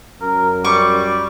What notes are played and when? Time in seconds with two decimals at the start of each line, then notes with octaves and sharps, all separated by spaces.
0.21 F#2 A#4
0.64 G3 C#6 D6